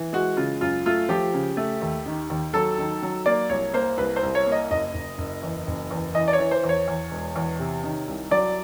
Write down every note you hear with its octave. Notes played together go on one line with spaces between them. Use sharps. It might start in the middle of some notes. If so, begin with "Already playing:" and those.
Already playing: E3
G#3 F#4
C#3 F4
F#2 F4
A3 F4
F3 G4
C#3
A3
D#2
D#3
D#2
F#3 A4
D#3
F#3
A#3 D5
C2 C#5
A#3 C5
C2 B4
C5
C2
C#5
A#3
D#5
F#1 D#5
F#1
F#1
E2
F#1
E2
E3 D#5
D5
C#5
E3
C5
E2
C#5
E2
E1
E2
C3
D#3
C2
F#3 D5